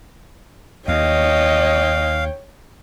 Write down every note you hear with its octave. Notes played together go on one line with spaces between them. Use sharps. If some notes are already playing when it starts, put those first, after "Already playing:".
D#2 C#5 D#5 F5 G5